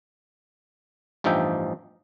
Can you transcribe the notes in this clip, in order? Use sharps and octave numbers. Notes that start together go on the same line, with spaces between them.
A1 G2 F3 D#4 E5 G5